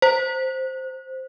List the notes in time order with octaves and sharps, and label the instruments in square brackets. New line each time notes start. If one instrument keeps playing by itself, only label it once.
[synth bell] C5